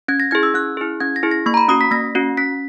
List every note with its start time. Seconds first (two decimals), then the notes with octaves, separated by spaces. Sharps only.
0.08 C#4 G#6
0.20 A#6
0.31 E4 G#4 G#6
0.43 E6
0.54 C#4 F#6
0.77 E4 G#4
1.00 C#4 G#6
1.16 A#6
1.23 E4 G#4
1.31 A#6
1.46 A#3 C#6
1.54 A#5
1.57 B5
1.68 C#4 F#4 D#6
1.81 B6
1.91 A#3 A#6
2.15 C#4 F#4
2.37 C#4 B6